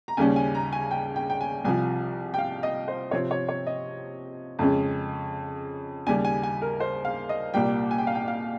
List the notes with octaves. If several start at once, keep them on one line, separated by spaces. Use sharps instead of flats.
A#5
D#2 C#3 G3 C#4 G#5
G#5
A#5
G#5
G5
G5
G5
G#5
C2 C3 F3 G#5
G5
F5
D#5
C5
C3 F3 C4 C#5
C#5
C#5
D#5
F2 C#3 G#3 C#4
D#2 C#3 G3 G#5
G#5
G#5
A#4
C5
F5
D#5
C2 A#2 G3 A#3 G5
G#5
G5
F5
G5
F5